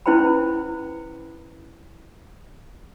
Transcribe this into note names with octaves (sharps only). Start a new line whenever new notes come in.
C#4 E4 B4 C5 G5 B5